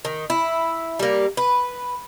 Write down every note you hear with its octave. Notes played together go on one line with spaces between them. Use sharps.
D#3
E4
G3 A#3
B4